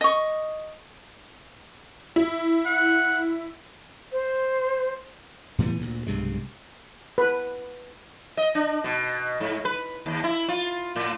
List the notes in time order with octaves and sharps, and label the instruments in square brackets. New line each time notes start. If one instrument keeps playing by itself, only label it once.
[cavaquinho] D#5 C#6
[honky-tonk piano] E4
[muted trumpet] F#5
[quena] C5
[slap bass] A2 E3 G3 B3
D2 A#2
B1 G2 C3 G#3
[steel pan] B4
[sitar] D#5
D4
B2
G#2
B4
D#2
E4
F4
A2